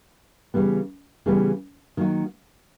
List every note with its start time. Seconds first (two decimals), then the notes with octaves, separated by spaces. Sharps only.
0.54 C#3 E3 G3 B3
1.26 C#3 E3 G3 B3
1.97 D#3 F#3 A#3 D#4 F#4